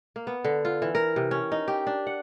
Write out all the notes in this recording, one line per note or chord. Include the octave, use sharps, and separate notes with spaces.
A#3
B3
D3
F4
E3
A#4
C3
C#4
D#4
G4
D4
F#5